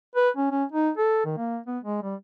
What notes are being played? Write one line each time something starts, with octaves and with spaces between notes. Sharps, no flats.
B4
C#4
C#4
D#4
A4
D#3
A#3
B3
G#3
G3